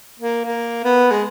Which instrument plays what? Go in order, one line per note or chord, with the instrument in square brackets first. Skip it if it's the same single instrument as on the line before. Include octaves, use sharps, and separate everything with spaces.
[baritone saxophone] A#3
A#3
B3
G#3